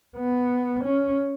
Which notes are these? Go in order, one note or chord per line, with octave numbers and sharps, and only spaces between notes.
B3
C#4